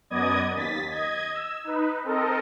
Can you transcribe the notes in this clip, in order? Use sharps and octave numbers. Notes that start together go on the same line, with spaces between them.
F#2 B3 D5 D#5 D#6 G#6
D#2 A6 B6
D#5 G#6
E6
D#4 B4
C4 A4 A#4 D#5